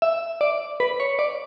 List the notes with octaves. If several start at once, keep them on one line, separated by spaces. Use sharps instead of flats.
E5
D5
B4
C#5
D5